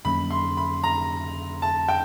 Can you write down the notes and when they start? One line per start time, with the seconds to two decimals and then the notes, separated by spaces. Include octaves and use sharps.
0.05 F2 D3 F#3 A#3 C#4 B5
0.31 C6
0.57 B5
0.84 A#5
1.62 A5
1.88 G5